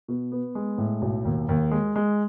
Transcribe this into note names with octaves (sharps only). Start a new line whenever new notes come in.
B2
B3
G#3
A2
B1
D#2
D#2
G#3
G#3